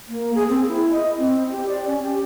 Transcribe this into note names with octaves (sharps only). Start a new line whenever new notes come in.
A#3
G#4
C4
E4
D#5
C4
G4
D5
C#4
G4